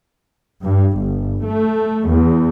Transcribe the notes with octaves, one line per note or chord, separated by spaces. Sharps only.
G2
G1
A3
E2